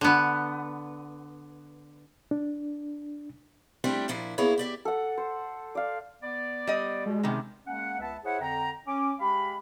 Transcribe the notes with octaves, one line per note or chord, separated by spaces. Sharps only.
D3 B3
D4
G3 A3 C4 D4 E4 G4
A#2 F3 D4 E4
A#3 B3 E4 G#4 C#5
G4 D5 E5
A4 F#5
C5
D5 F5
B3 D5
G3 D#5
B2 G#3
C3 D#3 B3 C#4
G#3 A#3 C#4 F#5
C#2 B3 B4 E5 F#5 A5
E4 G#4 C5 C#5 E5 F#5
F2 D3 G5 A#5
C#4 D6
G#3 G4 F5 B5